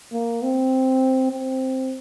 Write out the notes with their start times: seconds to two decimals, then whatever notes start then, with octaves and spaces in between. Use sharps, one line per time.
0.12 A#3
0.42 C4
1.31 C4